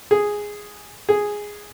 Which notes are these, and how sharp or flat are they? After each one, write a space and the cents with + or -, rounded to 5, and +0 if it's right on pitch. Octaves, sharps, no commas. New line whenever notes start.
G#4 -5
G#4 -5